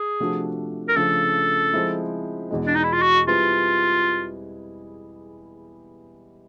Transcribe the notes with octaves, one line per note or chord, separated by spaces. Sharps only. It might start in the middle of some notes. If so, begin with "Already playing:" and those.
Already playing: G#4
C3 F3 A3 D4 F#4
A#4
C#3 F3 A3 D4 A4
F3 G#3 C4 E4
E2 B2 G#3
D4
D#4
E4
F4
F#4
G3 C4 E4 F4 G#4 B4